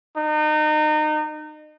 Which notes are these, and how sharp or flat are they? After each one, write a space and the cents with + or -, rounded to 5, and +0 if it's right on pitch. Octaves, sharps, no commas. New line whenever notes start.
D#4 -30